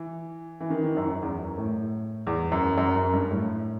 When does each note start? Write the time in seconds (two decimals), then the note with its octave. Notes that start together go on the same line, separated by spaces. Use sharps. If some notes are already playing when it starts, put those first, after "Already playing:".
Already playing: E3
0.61 E3
0.70 D#3
0.84 D#3
0.97 F#2
1.10 F#2
1.22 E2
1.39 F#2
1.58 A2
2.27 E2
2.52 F#2
2.78 F#2
2.96 F#2
3.13 G2
3.31 A2